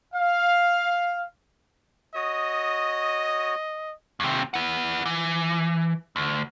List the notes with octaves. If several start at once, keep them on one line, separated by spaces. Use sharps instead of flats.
F5
F#4 C#5 D#5 D#6
D#2 C3
E4 F#5
E3
D2